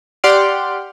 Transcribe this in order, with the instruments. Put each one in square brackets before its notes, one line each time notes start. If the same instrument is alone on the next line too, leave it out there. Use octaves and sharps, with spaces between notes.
[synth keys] G4 D5 F#5 C6 F6 D7